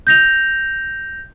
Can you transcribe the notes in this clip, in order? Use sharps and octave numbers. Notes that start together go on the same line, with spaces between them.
G6 A#6 F7